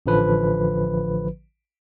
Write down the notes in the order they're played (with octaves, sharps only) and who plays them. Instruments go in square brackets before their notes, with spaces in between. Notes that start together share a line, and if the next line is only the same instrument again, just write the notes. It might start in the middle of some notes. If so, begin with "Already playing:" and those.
[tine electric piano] A1 D3 F3 B4